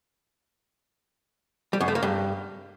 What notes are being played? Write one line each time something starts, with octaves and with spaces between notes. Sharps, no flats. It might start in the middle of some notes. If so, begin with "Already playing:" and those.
G3
F#2
A3
A#3
G2